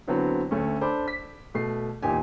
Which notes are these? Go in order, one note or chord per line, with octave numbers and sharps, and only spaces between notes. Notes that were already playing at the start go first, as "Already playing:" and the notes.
D3 F#3 B3 C4 E4
D2 A3 C#4
D4 A4 C5 B5 D6
B6
B2 A3 C7
D#1 E2 A#2 D#4 G4 G#5